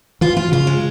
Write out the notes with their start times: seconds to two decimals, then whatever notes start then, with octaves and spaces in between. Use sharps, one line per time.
0.21 E3 F4
0.37 F4
0.52 C#3 F4
0.67 G#3